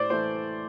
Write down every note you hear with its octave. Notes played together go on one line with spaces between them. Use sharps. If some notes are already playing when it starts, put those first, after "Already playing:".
Already playing: A2 C5 D5
E3 A3 C5